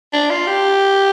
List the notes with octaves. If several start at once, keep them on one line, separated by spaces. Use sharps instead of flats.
D4
F4
G4